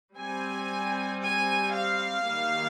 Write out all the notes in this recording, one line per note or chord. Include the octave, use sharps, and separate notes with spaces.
G3 C4 G#5
G#5
F5
D#3 G3 A#3